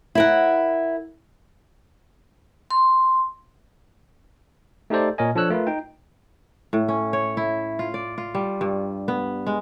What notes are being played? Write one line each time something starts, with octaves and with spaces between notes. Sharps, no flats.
E4 A#4 F#5
C6
A3 D#4 G4 A4 C5 D5
A#2 A#4 C#5 D#5 G#5
F3 D4 A4 C#5 E6 F#6
A3 F4 A#4 B4
D#4 G5
A2
C#4
C#5
E4
F4
D5
F4
G3
G2
B3
G#3